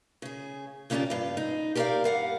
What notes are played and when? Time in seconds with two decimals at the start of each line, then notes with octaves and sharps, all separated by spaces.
0.22 C#3 G#4
0.90 C#3 A#3 C#4 D4 F4 G4
1.10 G2 F5
1.37 D#4
1.75 G4 A4 A#4 C5 D5 F5
2.04 G2 F5 F#5